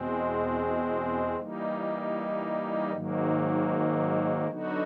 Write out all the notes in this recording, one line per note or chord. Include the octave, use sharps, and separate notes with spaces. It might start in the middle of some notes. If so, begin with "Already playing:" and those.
Already playing: E2 B2 G#3 C4
E3 G3 A#3 D#4
G#2 D#3 F#3 A#3
D3 F#3 B3 D#4 F#4